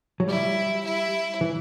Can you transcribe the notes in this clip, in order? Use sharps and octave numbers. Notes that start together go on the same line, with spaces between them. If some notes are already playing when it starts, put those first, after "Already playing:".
F#3
G3 E4
E4
E3